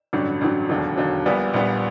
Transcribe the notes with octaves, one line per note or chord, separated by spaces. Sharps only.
A1 G2 D3 F#3
A1 G2 D3 F#3
E1 D#2 D3 F#3
E1 D#2 D3 F#3
A#1 A#2 G3 B3
A#1 A#2 G3 B3